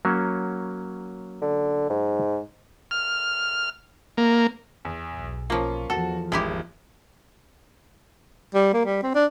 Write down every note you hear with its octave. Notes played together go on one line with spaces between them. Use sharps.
F#3 A#3 C#4
D3
G#2
F6
A#3
E2
B1
F3 A#3 C#4 F4
E2 F3 F#4 A4
G#1 G#3 E4 G4
G3
A#3
G3
C4
D4